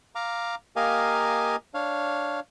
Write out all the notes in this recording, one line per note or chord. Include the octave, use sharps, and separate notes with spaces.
F5 A#5 D6
A#3 G4 A#4 D#5 F5 G#5
D4 C#5 F5